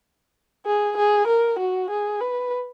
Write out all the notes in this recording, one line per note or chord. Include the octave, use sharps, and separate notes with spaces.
G#4
G#4
A#4
F#4
G#4
B4